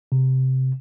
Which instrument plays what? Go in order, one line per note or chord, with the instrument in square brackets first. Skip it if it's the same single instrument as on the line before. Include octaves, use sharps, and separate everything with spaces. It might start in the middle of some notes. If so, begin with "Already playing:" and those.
[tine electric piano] C3